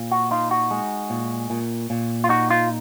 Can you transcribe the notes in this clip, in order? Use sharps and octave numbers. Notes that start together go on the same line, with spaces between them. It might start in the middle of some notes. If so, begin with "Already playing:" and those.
Already playing: A#2
F#4
D#4 F4
F#4
G#3
A#2
A#2
A#2
F4
D#4 F#4
F4